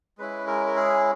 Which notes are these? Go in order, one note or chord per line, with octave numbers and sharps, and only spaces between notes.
G#3 C#4 E4 B4
A#4
A#4
G#4